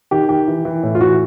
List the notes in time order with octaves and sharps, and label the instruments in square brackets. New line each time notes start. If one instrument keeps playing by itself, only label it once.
[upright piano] D#3 G4
D#3 G4
E3
E3
A2
F4
E3 F#4